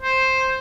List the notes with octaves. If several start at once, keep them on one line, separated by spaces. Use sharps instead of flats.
C5